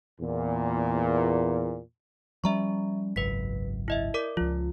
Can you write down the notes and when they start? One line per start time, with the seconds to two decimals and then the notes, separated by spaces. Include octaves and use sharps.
0.20 E2 A#2
2.44 F3 G3 C#4 E5 A#5 C#6
3.16 G#1 C#2 F#2 B4 B6
3.88 E4 D#5 E5
4.14 A#4 D5 D6
4.37 C#2 F3 F4